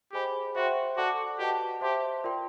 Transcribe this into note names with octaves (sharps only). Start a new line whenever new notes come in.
G4 G#4 C5 D#5 G#5 B5
F#4 C5 E5 G5 C6
F#4 A4 D5 F#5 A5 D6
F#4 G4 B4 D#5 F#5 A5
G4 C5 E5 A5 C6
F4 A#4 D5 G5 C6